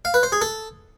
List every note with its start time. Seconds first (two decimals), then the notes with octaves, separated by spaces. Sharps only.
0.05 F5
0.14 B4
0.23 C5
0.32 G#4
0.41 A4